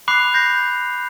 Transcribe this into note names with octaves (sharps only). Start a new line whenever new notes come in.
B5 D6 F#6 C7 F7
G6 A#6 C7